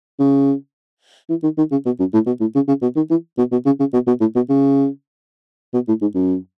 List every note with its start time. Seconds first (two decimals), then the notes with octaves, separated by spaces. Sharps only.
0.19 C#3
1.30 E3
1.43 D#3
1.58 D#3
1.71 C#3
1.86 B2
1.99 F#2
2.13 A2
2.27 B2
2.40 A2
2.55 C#3
2.68 C#3
2.82 B2
2.96 D#3
3.10 E3
3.38 B2
3.52 B2
3.66 C#3
3.80 C#3
3.93 B2
4.07 B2
4.20 A2
4.35 B2
4.49 C#3
5.74 B2
5.88 A2
6.01 G#2
6.15 F#2